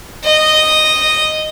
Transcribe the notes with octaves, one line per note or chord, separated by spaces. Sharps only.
D#5